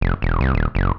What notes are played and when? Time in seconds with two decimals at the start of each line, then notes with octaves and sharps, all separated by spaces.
0.01 F1
0.22 E1
0.41 C2
0.54 D#1
0.75 F#1